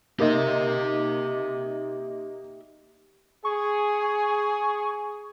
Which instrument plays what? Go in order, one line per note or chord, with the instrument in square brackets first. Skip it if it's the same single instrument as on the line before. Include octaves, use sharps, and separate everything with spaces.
[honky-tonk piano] A#3 D#4 [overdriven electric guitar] G4 E5
[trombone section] G#4 [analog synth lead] C#6